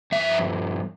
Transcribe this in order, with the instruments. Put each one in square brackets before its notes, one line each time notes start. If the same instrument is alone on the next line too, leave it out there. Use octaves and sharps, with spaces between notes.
[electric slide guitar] G2 F3 E5